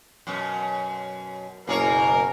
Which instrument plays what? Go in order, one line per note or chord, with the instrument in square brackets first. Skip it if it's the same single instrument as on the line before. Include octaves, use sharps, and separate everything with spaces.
[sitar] F#2 B2 C#4
[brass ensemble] F#1 B2 A#4 [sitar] A#3 G#4 C#5